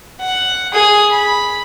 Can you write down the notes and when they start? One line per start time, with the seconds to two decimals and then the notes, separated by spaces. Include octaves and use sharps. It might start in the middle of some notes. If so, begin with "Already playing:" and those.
0.20 F#5
0.73 G#4 D#6
1.12 B5